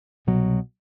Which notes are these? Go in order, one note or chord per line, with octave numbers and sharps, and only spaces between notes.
C2 B2 F#3